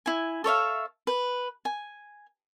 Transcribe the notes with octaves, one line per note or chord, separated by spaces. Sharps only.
E4 G#5
A4 C#5 E5 F5
B4
G#5